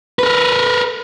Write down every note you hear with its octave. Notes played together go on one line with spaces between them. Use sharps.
A#4 B4